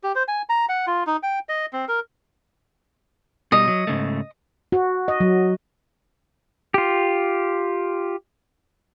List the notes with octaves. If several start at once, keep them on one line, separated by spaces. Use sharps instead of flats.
G4
C5
G#5
A#5
F#5
F4
D#4
G5
D#5
C4
A#4
B2 G3 D#5
F#3
G#2 C#3 A3
F#4
D#5
F#3
F4 G4